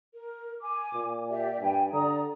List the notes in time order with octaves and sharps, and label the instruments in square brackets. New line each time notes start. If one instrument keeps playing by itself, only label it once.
[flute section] A#4
G#5 D6
[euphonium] A#2
[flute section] G4 D5 E5
[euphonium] G2 [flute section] G5 G#5
[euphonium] D3 [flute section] D5 A#5 D#6